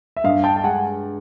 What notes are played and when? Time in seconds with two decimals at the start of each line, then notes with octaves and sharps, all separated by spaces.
0.17 E5
0.24 G2 D#5 F5
0.44 G5 A5
0.56 A5
0.64 G#3 F#5 G#5